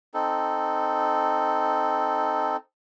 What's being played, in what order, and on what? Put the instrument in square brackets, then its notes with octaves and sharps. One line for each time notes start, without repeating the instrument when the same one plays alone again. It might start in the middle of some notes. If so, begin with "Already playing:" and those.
[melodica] C4 D#4 A4